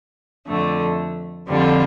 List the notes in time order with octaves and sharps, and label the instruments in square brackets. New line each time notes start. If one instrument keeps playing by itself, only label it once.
[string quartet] F2 D3 A3
F2 D3 G3 C4 F4